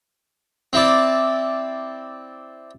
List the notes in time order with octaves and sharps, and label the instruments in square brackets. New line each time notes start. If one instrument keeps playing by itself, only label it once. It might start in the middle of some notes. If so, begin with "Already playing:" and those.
[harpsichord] C4 E4 D5